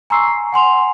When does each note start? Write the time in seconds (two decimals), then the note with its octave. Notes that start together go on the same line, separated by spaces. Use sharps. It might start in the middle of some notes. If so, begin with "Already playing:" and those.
0.10 G#5 A#5 C6 C#6 E6 C7
0.28 A#5
0.53 F#5 G#5 C6 F7